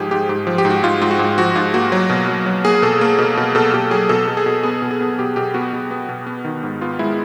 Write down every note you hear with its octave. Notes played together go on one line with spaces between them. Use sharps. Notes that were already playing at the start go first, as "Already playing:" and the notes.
Already playing: G#2 F3 G4 G#4
G#2 G4
G#2 G4
F3
G4
G#2
F#4
G#2 F4
G#2 F4
F#4
G#2
F3 F#4
G#2 F4
A#3 F#4
F#3
B2
F#3
F#3
A#3 G#4
B2 A4
A#3
B2
B2
B2 A4
B2 G4
F#3 G#4
B2 A4
B2
G#4
B2
B3 G#4
B2
G#4
B3
B2 G4
B2 G4
B3 F#4
B2
B3
B2
B3
D#3
G#2
B3 F4
G#3 E4